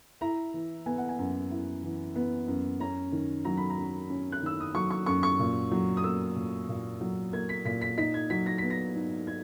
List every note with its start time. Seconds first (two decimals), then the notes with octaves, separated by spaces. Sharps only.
0.21 E4 A#5
0.54 E3
0.86 B3 G#5
0.98 F#5
1.09 G#5
1.19 F#2
1.51 E4
1.83 E3
2.16 B3
2.48 F#2
2.80 C#4 A#5
3.12 D#3
3.45 F#3 A#5
3.57 B5
3.70 A#5
3.77 F#2
4.10 C#4
4.32 F#6
4.42 D#3 E6
4.60 D#6
4.74 F#3 C#6
4.90 C#6
5.06 F#2 C#6
5.23 C#6
5.39 A#2
5.71 F#3
5.97 D#6
6.04 A#3 E6
6.36 A#2
6.69 A#2
7.01 F#3
7.33 A#3 G#6
7.49 B6
7.65 A#2 B6
7.82 B6
7.98 D#4 B6
8.14 G#6
8.30 F#3 B6
8.46 A#6
8.58 B3 B6
8.70 A#6
8.95 G#2
9.27 D#4 G#6